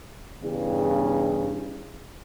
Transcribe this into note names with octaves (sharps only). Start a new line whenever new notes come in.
E2 G2 C#3